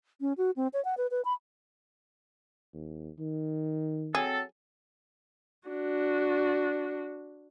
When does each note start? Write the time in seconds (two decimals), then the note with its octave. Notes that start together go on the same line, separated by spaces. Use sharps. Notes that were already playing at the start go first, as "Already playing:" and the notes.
0.21 C#4
0.38 F#4
0.56 C4
0.73 C#5
0.85 F#5
0.97 B4
1.11 B4
1.25 B5
2.74 D#2
3.19 D#3
4.15 F#3 C4 G#4 A4
5.68 D4 F#4